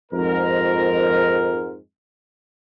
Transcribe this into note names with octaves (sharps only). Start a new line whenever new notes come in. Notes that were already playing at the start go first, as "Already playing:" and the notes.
F2 G#2 A#4